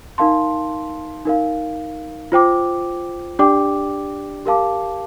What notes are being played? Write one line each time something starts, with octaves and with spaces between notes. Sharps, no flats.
D#4 A#4 F5 A5 C6
D#4 A#4 F5
F4 C5 G5 D6
D4 G4 D5 G5 D6
G4 A#4 F5 A5 D6